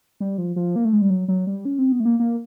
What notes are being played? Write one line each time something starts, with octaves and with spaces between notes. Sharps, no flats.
G3
F3
F3
A#3
A3
G#3
G3
F#3
F#3
G3
C#4
C4
B3
A3
A#3
A#3